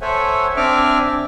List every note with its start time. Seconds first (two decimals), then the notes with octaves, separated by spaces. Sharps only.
0.01 A4 C5 C#5 E5 F#5 G#5
0.57 C4 D4 E5 G#5 D6 F6